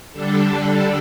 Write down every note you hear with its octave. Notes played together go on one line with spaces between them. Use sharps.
D3 G3 D4 A4